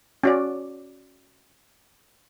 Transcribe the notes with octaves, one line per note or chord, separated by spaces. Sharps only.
C#4 F#4 D5